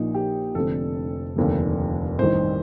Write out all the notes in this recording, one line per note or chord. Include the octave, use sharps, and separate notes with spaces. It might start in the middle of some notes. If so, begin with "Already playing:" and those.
Already playing: A#1 A#2 F3 D#4
G4
F1 F2 D3 A4
F1 D#2 D3 F3
A1 G2 D#3 C5